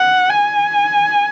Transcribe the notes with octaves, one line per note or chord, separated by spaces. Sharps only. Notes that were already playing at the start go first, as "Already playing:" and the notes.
Already playing: F#5
G#5